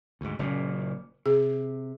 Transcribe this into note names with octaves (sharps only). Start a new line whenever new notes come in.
D2 G#2
F#1 F#2 A#2
C3 G#4